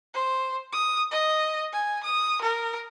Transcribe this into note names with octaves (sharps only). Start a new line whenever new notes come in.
C5
D#6
D#5
G#5
D#6
A#4